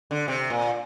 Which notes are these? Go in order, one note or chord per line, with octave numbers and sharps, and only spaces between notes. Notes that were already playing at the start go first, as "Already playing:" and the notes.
D3
C3
A#2